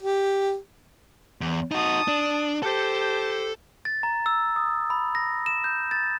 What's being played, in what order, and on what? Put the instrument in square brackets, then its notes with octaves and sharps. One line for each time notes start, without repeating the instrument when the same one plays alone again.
[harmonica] G4
[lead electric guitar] E2
[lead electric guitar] D#4 F#4 [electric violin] A5 D#6
[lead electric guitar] D4
[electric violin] G4 C5 [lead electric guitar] A4 A5
[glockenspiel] A6
A#5
E6
D#6
B5
A#6
E7
G6
A6